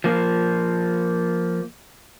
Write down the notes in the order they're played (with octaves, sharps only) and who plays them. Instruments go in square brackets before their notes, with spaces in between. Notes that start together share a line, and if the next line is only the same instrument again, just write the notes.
[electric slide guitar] F3 A#3